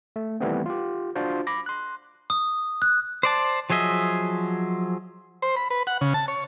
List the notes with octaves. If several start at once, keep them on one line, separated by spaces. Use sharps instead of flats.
A3
D#3 E3 G3 A3 B3 C4
F4 G4
D4 F4 F#4 C5
B5 D6 A#6
C6 F#6
D#6
F#6
C5 D5 A5
F3 F#3 G#4 D#5 E5
C5
B5
B4
F#5
C#3
A5
C#5